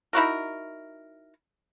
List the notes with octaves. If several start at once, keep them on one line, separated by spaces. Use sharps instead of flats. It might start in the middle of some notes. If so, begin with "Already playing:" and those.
D#4 E4 F#4 A#4